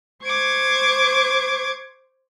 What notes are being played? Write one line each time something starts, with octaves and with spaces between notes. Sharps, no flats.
C5 C#6 D6 G#6